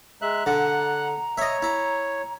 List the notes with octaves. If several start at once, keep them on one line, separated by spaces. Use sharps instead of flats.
G#3 E5 A#5 F#6
D3 F#5 F#6
C#5 D#5 E5
E4